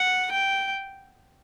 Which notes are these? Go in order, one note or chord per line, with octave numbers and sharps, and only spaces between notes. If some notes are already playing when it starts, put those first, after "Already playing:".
Already playing: F#5
G5